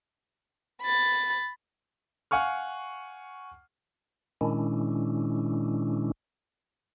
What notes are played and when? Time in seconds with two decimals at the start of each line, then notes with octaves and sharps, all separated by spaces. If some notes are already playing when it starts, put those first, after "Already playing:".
0.82 B5 A6
2.31 F5 F#5 G#5 C#6 F6
4.41 A#2 D#3 G#3 C#4 D4 E4